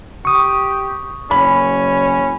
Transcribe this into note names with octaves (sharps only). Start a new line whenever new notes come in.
G4 C#6 D#6
F#1 C#4 B5